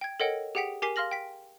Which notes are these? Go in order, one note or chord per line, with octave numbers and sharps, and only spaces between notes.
G5 G#6
A4 A#4 C#5 D#5 F#5 G5
G4 G#4 F#5 G5 B6
G4 A#4 G#5 D6 B6 C7
F5 C6 F6 A#6 F#7
G5 B6